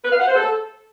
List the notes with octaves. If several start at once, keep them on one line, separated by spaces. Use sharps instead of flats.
B4
F5
F#5
C5
A4